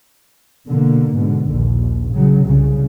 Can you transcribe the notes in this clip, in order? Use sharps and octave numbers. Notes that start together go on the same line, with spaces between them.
B2 D3 A#3
G#2 B2 D3
A#1 D#2
C#3 F#3
C2 C#3